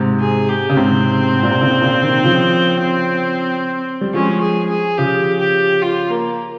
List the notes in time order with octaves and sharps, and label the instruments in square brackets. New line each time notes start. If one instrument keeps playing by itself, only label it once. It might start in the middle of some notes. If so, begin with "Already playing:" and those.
Already playing: [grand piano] G#2 C3
[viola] G#4
G4
[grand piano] C#3
[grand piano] G#2 C3 [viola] C4
[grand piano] G#2
A#2
C3
A#2 C#3
A#2 C#3
C3 D#3
C#3 F3
G3
[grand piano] F3 G#3 [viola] C#4
[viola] G#4
G#4
[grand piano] C#3 F3 [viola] G4
[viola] G4
F4
A#3